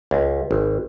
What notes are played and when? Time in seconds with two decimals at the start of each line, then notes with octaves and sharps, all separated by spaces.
0.11 C#2
0.51 G#1